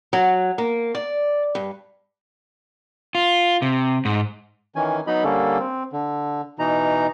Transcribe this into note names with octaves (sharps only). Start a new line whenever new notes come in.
F#3
A#3
D5
G2
F4
C3
G#2
D#3 E3 C#4 G#5
F#3 B3 D#4 D#5 B5
D3 G3 A#3 C#4 A4
C4
D3
B2 E3 D#4 A#5